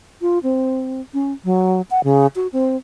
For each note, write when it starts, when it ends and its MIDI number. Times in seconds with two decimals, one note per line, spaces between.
0.22 0.39 65
0.43 1.01 60
1.14 1.32 61
1.45 1.82 54
1.91 2.03 78
2.04 2.27 49
2.36 2.47 66
2.53 2.77 60